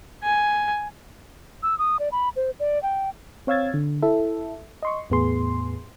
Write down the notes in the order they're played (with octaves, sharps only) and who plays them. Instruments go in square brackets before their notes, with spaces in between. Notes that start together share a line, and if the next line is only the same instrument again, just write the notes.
[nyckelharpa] G#5
[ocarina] E6
D#6
D5
B5
C5
D5
G5
[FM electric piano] C4 C#5 F5 E6 G#6 A6
D3
E4 A4 E5
D#5 C6 C#6
E2 A2 B3 G#4 C6